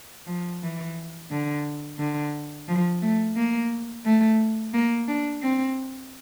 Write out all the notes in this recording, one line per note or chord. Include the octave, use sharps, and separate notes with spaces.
F3
E3
D3
D3
F3
A3
A#3
A3
A#3
D4
C4